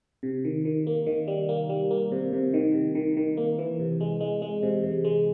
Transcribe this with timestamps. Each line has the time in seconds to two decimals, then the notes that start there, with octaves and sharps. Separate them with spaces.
0.23 C3
0.45 D#3
0.65 D#3
0.87 A#3
1.06 D#3
1.28 G3
1.49 A#3
1.69 G3
1.91 A#3
2.12 C3
2.33 C3
2.54 D#3
2.74 C3
2.95 D#3
3.17 D#3
3.37 A#3
3.59 E3
3.80 C3
4.01 G#3
4.20 G#3
4.42 G#3
4.63 C3
4.83 C3
5.04 G#3